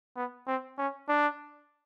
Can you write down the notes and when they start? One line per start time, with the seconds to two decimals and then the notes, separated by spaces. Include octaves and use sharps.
0.16 B3
0.47 C4
0.78 C#4
1.09 D4